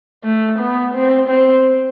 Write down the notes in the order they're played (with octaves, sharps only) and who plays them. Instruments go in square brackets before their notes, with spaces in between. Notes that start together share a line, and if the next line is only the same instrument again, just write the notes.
[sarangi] A3
B3
C4
C4